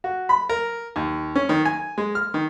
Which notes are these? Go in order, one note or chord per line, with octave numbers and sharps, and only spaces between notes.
F#4
B5
A#4
D#2
C#4
D#3
G#5
G#3
F6
D#3